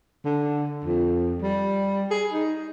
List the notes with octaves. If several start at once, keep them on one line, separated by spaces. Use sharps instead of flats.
D3
F2
G3
G#4
D#4